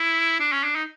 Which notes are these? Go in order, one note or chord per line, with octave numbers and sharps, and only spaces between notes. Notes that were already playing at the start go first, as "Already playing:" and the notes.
Already playing: E4
D4
C#4
D4
D#4